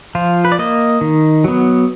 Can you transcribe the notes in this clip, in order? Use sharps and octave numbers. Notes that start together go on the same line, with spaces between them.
F3 F4
B4
D5
A#3 D#5
D#3
F#3 B3